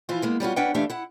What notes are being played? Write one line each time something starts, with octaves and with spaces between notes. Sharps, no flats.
E3 F3 E4 F4
G#3 A#3 B3
G3 C#4 F4 F#4
C#4 D4 B4 F#5 G5
F#2 E3 A3 D4 G4 F5
E4 F#5